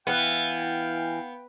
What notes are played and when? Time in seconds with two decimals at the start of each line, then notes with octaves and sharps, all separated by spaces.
0.07 E3 B3 F5 G5